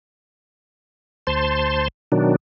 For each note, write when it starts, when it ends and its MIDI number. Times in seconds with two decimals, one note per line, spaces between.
1.27 1.88 38
1.27 1.88 72
1.27 1.88 81
1.27 1.88 84
2.12 2.36 47
2.12 2.36 51
2.12 2.36 54
2.12 2.36 62